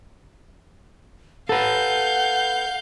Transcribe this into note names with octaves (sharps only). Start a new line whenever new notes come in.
A4 B4 F5 F#5 G6